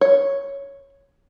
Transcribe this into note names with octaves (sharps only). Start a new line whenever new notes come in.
C#5